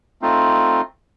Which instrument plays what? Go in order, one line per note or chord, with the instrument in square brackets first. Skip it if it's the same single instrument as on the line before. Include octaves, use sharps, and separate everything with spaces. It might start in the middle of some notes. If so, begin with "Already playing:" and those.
[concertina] A3 C4 D#4 F4